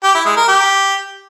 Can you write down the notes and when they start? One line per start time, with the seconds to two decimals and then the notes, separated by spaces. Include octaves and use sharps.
0.03 G4
0.14 E4
0.26 G#3
0.37 A#4
0.48 G4